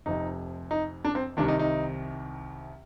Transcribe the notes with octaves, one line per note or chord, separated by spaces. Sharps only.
F1 F2 C3 D#4
D#4
D4
C4
C2 C3 D#3 D4
D#4
D#4